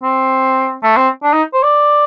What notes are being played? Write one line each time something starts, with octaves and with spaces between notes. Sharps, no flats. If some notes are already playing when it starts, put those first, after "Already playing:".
C4
A3
C4
D4
D#4
C5
D5